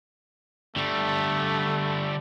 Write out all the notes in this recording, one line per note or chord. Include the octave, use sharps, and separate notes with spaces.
D3 G3 A3